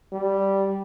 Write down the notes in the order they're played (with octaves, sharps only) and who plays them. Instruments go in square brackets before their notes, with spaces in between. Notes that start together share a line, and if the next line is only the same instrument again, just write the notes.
[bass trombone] G3